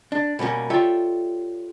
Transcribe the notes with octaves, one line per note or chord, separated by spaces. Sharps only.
D4
B2 G3 A#3 C#4
F4 G4 A4 C#5 D5 E5